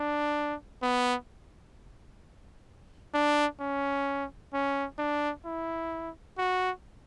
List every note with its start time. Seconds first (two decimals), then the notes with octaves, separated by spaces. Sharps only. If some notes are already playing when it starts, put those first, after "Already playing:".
Already playing: D4
0.83 B3
3.14 D4
3.60 C#4
4.53 C#4
4.99 D4
5.45 E4
6.38 F#4